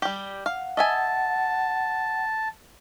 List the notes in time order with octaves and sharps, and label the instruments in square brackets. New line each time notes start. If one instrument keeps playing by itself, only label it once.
[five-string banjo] G3 G4
[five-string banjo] F5 [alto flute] F#5
[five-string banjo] D#5 E5 G#5 [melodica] A5